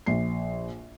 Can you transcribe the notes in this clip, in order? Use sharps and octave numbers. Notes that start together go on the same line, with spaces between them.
A#1 C7